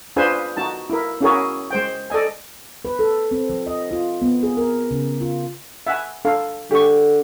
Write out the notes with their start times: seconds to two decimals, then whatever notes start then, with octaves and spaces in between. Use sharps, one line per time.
0.16 D4 F4 G#4 B4 C5 G#5
0.57 D#4 F#4 A5
0.90 E4 A#4
1.21 C#4 E4 F#4 G#4 A#4 C#5
1.71 G#3 C5 G5
2.10 A4 D5 D#5 G#5
2.85 B4
2.99 A4
3.31 C4
3.50 F3
3.67 D#5
3.91 F4
4.22 B3
4.43 G#4
4.57 A#4
4.91 C#3
5.21 F4
5.87 E5 F#5 G#5
6.25 D4 A4 F5
6.71 D3 G4 C#6